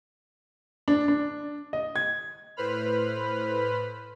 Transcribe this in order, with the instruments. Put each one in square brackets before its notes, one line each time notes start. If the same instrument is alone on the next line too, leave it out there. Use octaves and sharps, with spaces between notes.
[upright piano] D4
D4
D#5
G#6
[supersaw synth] A2 B4 C5 B5 F6